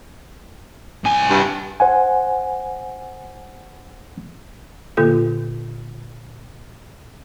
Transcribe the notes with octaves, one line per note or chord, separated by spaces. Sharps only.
C2 G#5
G2
C5 F#5 G#5
A#2 D3 A#3 F4 A4 G6